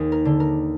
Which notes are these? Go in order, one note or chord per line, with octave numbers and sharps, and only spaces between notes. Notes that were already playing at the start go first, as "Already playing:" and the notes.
Already playing: D#2 G#4
A#4
D3
A#4